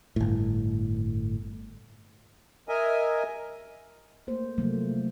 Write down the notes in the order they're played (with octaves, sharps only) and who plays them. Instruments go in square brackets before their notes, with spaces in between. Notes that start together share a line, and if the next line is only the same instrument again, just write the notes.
[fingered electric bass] G1 A2
[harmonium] A#4 D#5 E5 G#5
[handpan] A3 A#3 C5
C3 F3 F#3 A3 A#3